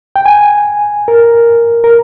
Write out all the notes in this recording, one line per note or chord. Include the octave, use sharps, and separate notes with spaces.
G5
G#5
A#4
A#4